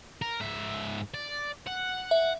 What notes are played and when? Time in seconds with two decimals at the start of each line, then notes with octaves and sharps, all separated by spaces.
0.22 A#4
0.40 G#2 E5
1.14 D5
1.67 F#5
2.11 E5